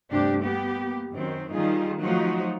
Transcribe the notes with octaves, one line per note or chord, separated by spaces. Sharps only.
D2 G2 C3 D4 G4
A#3 B3 G4
F#2 D#3 C4
D#3 G3 D#4 F4 G#4
F3 F#3 A3 D#4 F#4